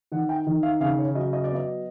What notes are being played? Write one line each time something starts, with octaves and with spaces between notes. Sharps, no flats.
D#3 F#5
G5
D#3
F5
C#3 F5
C#5
F#3 D#5
D#5
D5
B3 D#5